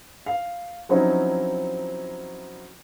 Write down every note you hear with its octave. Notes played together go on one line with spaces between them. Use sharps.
F5
F3 F#3 C4 C#4 D#4 E4